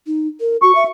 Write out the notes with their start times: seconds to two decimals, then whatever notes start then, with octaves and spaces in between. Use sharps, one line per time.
0.07 D#4
0.41 A#4
0.62 F#4 C#6
0.75 E5